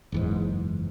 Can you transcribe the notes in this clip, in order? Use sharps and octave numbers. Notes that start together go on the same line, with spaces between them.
F#1 E2 G#2